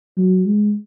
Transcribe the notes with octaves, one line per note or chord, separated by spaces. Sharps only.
F#3
G#3